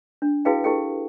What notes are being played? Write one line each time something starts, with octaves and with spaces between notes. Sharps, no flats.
D4
E4 F#4 G#4 B4 F5 G5
E4 G4 A4 G5